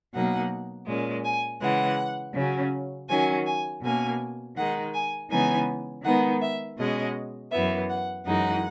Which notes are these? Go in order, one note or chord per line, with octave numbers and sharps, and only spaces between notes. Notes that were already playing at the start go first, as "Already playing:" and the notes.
B2 F#3 A#3 D#4 F#5
A#2 G#3 C#4
G#5
C#3 E3 G#3 F#5
C#3 F#3 C#4
D#3 F#3 C#4 G#5
G#5
B2 A#3 C#4 G#5
D#3 G#3 D#4 F#5
G#5
C#3 E3 G#3 B3 D#4 G#5
D#3 G#3 B3 D#4 F#5
E5
B2 G#3 C#4 D#5
F#2 E3 B3 E5
F#5
F#2 E3 G#3 D#4 F#5